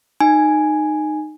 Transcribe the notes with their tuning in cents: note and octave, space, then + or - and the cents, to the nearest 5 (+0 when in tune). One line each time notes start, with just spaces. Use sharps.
D#4 -20 G#5 +0